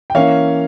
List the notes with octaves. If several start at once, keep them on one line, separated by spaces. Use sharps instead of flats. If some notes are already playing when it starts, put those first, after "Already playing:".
G5
E3 A#3 C#4 C#5 F5